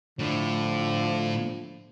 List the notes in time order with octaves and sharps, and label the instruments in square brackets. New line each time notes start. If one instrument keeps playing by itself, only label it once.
[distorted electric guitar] A2 [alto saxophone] D3 [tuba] F3